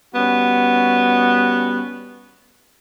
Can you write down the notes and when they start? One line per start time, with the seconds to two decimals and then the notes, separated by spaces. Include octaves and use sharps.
0.14 G3 B3 C#4 F#4